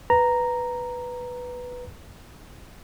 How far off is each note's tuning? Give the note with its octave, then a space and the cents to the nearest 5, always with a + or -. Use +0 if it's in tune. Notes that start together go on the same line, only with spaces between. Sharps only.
B4 +0 A#5 +0